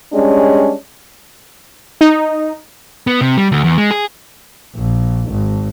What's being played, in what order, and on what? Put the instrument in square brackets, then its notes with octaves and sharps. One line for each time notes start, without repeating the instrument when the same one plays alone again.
[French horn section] G3 G#3 C#4 D4
[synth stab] D#4
[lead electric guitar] B3
C3
G3
D2
E2
G#3
G#4
[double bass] A#1
G#1